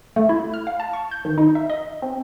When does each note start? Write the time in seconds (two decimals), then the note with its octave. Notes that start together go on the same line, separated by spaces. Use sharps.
0.16 A3
0.29 E4
0.54 F6
0.67 F5
0.80 A5
0.93 C#6
1.11 G6
1.25 D#3
1.38 D#4
1.55 E5
1.70 D#5
2.02 C4